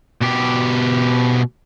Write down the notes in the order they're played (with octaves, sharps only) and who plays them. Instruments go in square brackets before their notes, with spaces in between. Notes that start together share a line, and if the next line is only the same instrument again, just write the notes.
[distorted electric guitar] B2 G4